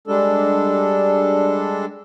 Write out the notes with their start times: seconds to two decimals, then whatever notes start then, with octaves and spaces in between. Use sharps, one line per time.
0.07 G3 G#3 D4 A4